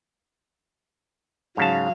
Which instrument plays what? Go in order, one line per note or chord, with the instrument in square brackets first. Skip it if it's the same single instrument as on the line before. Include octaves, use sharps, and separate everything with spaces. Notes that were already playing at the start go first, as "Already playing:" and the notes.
[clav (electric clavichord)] G#2 C#3 A5 [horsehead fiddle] F#3 F5